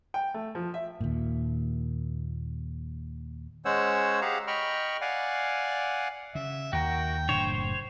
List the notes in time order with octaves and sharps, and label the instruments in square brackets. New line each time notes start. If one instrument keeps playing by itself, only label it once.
[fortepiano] G5
A3
F3
E5
[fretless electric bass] D#2 A#2
[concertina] G#3 C#4 C5 C#5 F#5 E6
G4 G#4 F5 F#5 A#5
D#5 G5 B5 C#6 F6
D5 F5 F#5 G#5
[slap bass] C#3 [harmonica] E5
[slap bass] D#2 [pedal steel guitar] F#4 A#4 [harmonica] G5
[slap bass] F#1 A2 D4 [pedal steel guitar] C5 C#5